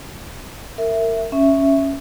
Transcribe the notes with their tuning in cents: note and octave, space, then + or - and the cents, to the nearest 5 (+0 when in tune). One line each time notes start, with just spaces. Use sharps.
A#4 -30 E5 +0
C#4 +0 E5 +0